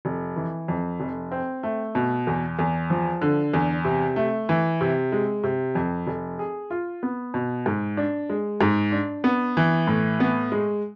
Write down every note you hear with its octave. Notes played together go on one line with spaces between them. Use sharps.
F1
E3
F2
F1
C4
A3
B2
E2
E2
F3
D3
E2
C3
A3
E3
C3
G#3
C3
F2
F1
G#4
F4
B3
B2
G#2
D4
G#3
G#2
D4
B3
E3
A2
B3
G#3